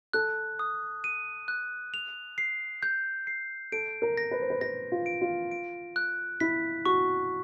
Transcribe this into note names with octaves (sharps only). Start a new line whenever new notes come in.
A4 F#6
D#6
D#7
F#6
F7
C7
G6
C7
A4 D7
A#4
A#6
B4
C5
B4
B4 A#6
F4
D7
F4
D7
F#6
E4 B6
F#4 C#6